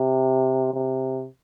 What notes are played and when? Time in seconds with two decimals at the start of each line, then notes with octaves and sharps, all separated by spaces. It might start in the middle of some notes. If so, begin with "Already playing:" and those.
Already playing: C3
0.74 C3